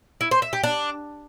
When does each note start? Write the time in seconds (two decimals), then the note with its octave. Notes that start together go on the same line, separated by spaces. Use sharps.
0.21 E4
0.31 C5
0.42 E5
0.53 G4
0.64 D4